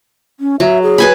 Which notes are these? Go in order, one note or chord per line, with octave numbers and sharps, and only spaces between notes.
C#4
F#3 E5
G#4
B4 G#5 B5